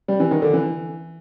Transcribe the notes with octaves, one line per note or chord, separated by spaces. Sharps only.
G3
E3
D#3
D3
E3